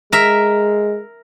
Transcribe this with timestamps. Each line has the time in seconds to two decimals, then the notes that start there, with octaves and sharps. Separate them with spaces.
0.12 G#3 A#4 E5